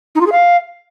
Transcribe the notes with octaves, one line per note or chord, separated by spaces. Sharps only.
D#4
F4
G#4
F5